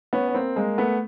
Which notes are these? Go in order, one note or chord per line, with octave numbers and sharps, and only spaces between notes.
B3 C#4
C#4
A#3 C4
G#3 A#3
A3 B3